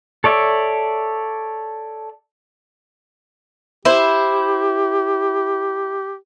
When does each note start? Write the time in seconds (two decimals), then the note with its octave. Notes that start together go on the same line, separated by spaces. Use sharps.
0.24 A4 C#5 D5 E5
3.85 E4 G4 C5